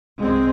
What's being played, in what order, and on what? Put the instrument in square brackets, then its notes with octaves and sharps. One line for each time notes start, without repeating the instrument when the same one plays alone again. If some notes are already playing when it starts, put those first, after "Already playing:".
[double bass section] C2 G#3 C4